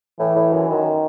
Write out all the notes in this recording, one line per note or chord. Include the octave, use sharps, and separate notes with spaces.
A2 E3
A2
F#2
F#2 D#3